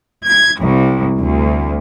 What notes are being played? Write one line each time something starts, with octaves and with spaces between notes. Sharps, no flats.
G#6
C2
D2